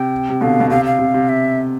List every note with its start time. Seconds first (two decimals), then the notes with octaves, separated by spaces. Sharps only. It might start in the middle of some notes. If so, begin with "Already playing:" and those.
Already playing: C3 G5
0.30 C3
0.41 B2 D3 F5
0.60 B2
0.70 C3 F5
0.85 F5
0.99 C3
1.14 C3
1.29 E5